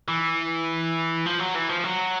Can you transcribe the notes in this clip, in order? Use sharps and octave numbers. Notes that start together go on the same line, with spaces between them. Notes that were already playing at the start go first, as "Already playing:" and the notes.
E3
F3
F#3
E3
F3
F#3